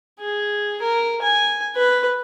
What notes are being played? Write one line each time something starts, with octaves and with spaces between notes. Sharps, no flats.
G#4
A#4
G#5
B4